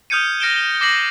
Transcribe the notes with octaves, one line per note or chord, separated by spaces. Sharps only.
D#6 F6 G6 G#6 C#7 D#7
F6 A#6 C#7 D7 E7 G7
D6 A#6 C7 F#7